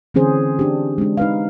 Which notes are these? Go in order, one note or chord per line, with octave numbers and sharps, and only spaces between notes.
D3 E3 C4 C#4 G#4 C5
D4 G4
G#3 D4
D#4 B4 F5